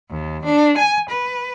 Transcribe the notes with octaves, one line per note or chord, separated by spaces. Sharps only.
D#2
D4
G#5
B4